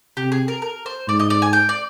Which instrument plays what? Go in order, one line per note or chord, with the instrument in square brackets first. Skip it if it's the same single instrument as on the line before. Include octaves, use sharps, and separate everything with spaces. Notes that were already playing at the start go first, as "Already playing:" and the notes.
[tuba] C3 [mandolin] G4
[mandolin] G#4
A#4
A#4
C5
[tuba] G#2 [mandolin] D5
[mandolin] D#5
D5
G#5
G5
D5